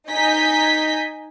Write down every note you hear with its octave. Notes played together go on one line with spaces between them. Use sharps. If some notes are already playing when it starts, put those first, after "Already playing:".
D#4 D#5 G#5 G6 B6